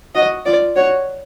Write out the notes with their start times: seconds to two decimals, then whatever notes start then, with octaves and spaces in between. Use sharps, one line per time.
0.15 F#4 D#5
0.46 F4 D5
0.76 F#4 C#5